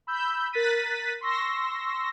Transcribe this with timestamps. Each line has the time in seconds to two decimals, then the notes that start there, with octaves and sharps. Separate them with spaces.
0.07 B5 E6 G6
0.53 A#4 F#6 A6 B6 D#7
1.21 C6 C#6 E6 A#6